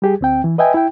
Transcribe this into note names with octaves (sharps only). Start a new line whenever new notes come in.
G3 G4 G#4
D2 C4 G5
E3
B4 D#5 E5 G5 G#5
E4 G5